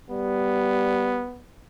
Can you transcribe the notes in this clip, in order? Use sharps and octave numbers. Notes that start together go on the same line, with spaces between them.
G3 B3